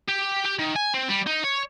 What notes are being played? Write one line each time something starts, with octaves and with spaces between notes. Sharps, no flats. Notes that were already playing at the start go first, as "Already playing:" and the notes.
G4
G4
D#3
G#5
C4
G3
D#4
C#5